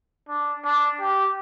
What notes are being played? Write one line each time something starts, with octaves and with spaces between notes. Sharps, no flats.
D4
D4
G4